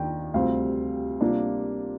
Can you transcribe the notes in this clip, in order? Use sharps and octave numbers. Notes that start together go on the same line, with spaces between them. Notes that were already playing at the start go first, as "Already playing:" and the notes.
Already playing: D#2 D#3 D4 G5
D2 C3 G3 C4 F4 F5
C3 G3 A#3 D4 F4